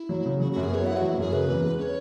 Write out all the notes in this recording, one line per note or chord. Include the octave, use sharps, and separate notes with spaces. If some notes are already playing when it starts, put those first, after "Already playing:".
Already playing: E4
F#3
C#3
F#3 F#4
F#2 F#4
G#4
B3 C#5
E4 F#5
F#3 F#4
E4
F#2 G#4
C#3 B4
E2
G#3
C#4 C#5